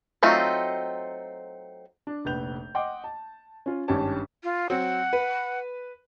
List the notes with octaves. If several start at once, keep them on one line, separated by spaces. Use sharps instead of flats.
F#3 A3 C4 D#4 F4
D4
F1 A#1 B4 G6 F7
D#5 F#5 G5 C6 D6
A5
C#4 F4
G#1 G2 C#4 G4 C#5 A5
F4
F#3 C4 F#5
B4